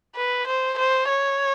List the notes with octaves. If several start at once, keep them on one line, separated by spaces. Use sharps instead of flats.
B4
C5
C5
C#5